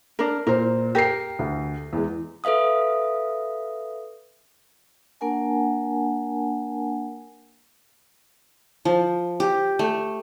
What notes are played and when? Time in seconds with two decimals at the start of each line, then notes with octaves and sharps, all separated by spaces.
0.19 D4 A#4
0.47 A#2 A#4 C5
0.95 G4 A#4 A#6 C7
1.39 D2
1.93 E2 G#3
2.44 A4 B4 E5 F5 D#6
5.21 A#3 D4 A#4 F#5 G#5 A5
8.85 F3
9.40 G4
9.79 A3